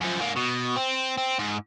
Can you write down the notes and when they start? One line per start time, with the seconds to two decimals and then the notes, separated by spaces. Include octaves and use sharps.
0.01 F#2 F3
0.19 G#2 A#3
0.36 B2
0.76 C4
1.18 C4
1.39 G#2